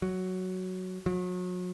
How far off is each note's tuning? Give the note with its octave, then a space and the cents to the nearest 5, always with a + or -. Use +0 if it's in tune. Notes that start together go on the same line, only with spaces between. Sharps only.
F#3 +5
F#3 -35